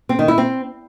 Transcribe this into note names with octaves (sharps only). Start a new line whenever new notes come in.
C4
D#3
E4
C4